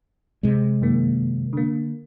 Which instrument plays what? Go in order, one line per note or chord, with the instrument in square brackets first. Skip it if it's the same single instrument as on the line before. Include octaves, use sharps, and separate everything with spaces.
[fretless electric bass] C3 G#3
[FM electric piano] F#2 D#3 A#3
D3 A#3